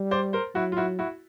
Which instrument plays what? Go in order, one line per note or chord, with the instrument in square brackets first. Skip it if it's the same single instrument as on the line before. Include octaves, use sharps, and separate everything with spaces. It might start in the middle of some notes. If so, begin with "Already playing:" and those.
Already playing: [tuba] G3
[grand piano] C5 D5
A#4 C5
[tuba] F#3 [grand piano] E4 F#4
[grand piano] F4
E4 F#4
E4 F#4